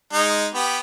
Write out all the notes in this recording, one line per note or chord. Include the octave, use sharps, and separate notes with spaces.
G#3 D#4
B3 G4